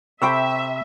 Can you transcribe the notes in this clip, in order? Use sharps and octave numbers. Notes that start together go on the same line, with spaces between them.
C3 A4 C5 E5 G5 B5 C#6 E6